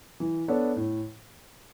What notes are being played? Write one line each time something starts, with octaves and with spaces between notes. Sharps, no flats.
E3
B3 D4 A4 C#5
A2